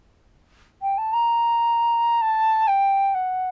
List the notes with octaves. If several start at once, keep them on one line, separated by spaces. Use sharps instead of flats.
G5
A5
A#5
A5
G5
F#5